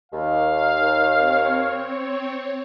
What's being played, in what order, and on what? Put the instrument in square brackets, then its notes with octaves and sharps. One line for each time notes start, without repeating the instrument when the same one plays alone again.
[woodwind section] D#2 [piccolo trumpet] F5
[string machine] C4 C#5